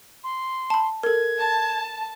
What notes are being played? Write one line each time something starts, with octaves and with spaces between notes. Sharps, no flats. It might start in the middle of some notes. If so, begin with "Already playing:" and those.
C6
A5 B5
A4 A#4 G#6
A5